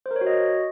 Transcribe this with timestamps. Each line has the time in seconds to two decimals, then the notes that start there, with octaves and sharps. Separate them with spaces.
0.06 C5
0.11 A#4
0.16 C#5
0.21 F#4
0.26 D#5